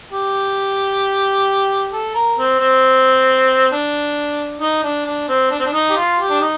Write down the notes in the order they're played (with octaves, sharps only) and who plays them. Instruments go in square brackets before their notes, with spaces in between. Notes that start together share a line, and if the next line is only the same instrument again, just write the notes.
[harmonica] G4
A4
A#4
C4
C4
D4
D#4
D4
D4
C4
D4
C4
D4
D#4
G4
F4
G4
D4
D#4